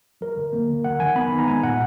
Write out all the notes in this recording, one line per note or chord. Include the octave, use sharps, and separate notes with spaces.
F#3 A#4
D3
A#3
D3
F#3 F#5
D#3 G#5
B3 B5
D#4
A#5
G#3 G#5
A#2 F#5